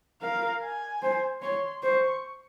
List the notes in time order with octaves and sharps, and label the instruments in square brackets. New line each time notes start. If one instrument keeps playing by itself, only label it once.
[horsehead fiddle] A#4 [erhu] F5
[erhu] G#5
[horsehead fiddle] C5
[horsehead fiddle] C#5 [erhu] C6
[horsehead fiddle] C5 [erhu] C#6